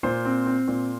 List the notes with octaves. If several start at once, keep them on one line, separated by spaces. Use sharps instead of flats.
A#2 C5
C4
C4
A#2